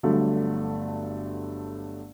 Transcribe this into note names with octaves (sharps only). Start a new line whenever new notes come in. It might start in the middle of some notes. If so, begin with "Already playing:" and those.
G1 G2 D3 F#3 A3